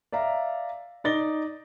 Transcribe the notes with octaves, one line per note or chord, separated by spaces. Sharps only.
D5 E5 F5 A#5
D#4 D5 A6 A#6 G7